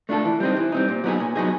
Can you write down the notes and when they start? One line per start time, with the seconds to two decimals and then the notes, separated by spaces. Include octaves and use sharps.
0.09 A3 D4 F4 A4
0.25 E3
0.40 G3 C4 D#4
0.56 E3
0.72 G3 C4 D#4
0.88 A#2
1.04 F#3 B3 D#4 G#4
1.20 A#2
1.36 F#3 B3 D#4 G#4